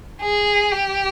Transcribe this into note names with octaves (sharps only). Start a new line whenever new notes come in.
G#4
G4